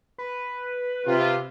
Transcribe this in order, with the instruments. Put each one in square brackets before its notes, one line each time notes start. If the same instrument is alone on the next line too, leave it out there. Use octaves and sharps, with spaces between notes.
[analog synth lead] B4
[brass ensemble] C3 F4